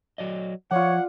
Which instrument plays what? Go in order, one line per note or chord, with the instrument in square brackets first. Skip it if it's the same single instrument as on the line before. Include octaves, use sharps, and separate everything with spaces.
[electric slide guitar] F#3 D5 D#5
[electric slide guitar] F3 [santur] F4 D5 [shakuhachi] C#5 [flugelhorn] F#5